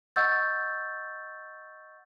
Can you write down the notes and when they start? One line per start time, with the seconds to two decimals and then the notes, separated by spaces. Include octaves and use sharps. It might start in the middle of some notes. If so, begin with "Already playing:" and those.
0.16 D#5 F#5 C#6 E6 G6 A6